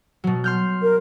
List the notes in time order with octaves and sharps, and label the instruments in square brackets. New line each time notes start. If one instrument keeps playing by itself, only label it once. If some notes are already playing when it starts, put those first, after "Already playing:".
[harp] B2 F#3
C6 F6 G6
[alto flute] A#4